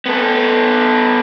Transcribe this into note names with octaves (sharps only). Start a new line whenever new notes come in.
B3 A4